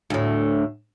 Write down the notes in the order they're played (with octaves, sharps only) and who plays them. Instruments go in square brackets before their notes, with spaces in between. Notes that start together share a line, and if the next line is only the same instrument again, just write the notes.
[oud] D2 A2